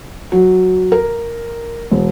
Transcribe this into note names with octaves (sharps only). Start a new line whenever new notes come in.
F#3
A#4
E1